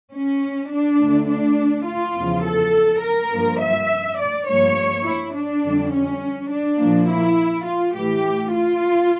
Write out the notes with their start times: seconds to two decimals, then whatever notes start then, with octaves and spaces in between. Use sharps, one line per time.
0.12 C#4
0.70 D4
0.99 D2 D3 A3
1.28 D4
1.86 F4
2.15 E2 C#3 F3
2.44 A4
3.02 A#4
3.31 G2 F3 A#3
3.60 E5
4.19 D5
4.47 G2 F3 A#3 C#5
5.04 E4
5.33 D4
5.62 F2 D3 G3
5.92 C#4
6.50 D4
6.78 A#2 F3 A#3
7.08 E4
7.65 F4
7.94 A2 E3 A3 G4
8.52 F4